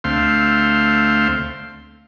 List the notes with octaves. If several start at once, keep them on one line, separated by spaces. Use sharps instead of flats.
D2 A3 C4 F5 C6